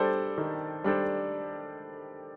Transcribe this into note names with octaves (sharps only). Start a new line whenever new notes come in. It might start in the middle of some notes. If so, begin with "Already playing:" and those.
Already playing: G3 D4 A4 C5
D#3
G3 D4 A4 C5